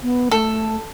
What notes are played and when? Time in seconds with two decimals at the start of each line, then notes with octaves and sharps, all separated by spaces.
0.03 B3
0.31 A3 A4